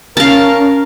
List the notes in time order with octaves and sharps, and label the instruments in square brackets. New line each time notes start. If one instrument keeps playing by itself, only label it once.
[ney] C#4 [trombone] A#4 [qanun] F5 A5